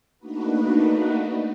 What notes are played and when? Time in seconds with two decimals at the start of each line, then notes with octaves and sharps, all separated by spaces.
0.19 A3 A#3 D4 D#4 F#4 B4